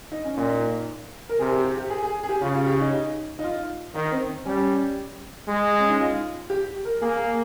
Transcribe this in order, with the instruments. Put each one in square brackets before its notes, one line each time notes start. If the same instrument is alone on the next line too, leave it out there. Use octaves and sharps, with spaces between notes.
[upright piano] D#4
C#4
[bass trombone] A#2 [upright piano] D#4
[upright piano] A#4
[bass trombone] C3 [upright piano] G#4
[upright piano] G4
G4
G4
G#4
G#4
G#4
G4
[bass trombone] C#3 [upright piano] F4
[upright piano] F4
G4
D#4
D#4
F4
[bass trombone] D#3 [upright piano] D#4
[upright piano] C4
[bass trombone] G3 [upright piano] C#4
[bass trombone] G#3
[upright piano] C#4
D#4
F4
G4
A#4
[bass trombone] A#3 [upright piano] G#4
[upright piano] G#4